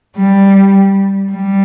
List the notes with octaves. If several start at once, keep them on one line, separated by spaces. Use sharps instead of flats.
G3
G3